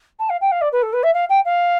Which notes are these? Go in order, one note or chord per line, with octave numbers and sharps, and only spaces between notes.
A5
F5
G5
F5
D5
B4
A4
B4
E5
F5
G5
F5